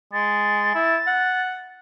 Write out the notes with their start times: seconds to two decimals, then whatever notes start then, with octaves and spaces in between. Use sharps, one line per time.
0.13 G#3 A6
0.75 E4
1.07 F#5